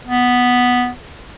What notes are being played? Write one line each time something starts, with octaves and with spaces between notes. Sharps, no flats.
B3